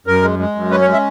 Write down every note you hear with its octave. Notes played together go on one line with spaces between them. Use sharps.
F#2 A#4
G#3
G#3
F#2
C#4 B4
C#5
G#3
E5